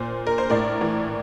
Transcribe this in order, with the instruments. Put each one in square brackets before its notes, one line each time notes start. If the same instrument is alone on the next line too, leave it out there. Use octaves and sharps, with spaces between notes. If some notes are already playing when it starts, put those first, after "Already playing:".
Already playing: [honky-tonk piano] A#2 C5
A#4
C5
A2 A#4 D5
E3